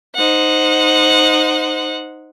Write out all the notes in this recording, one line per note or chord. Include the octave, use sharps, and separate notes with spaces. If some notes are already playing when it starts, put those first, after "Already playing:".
D#4 C5 F#5